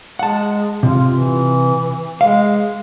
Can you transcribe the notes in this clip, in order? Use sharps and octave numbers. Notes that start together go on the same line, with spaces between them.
G#3 F#5 A5
C3 F4
E3
G#3 F5